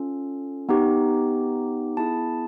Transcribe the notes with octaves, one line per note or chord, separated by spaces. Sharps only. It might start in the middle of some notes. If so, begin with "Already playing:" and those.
Already playing: C#4 F4 A4
B3 D#4 G4
B3 E4 G#4 A5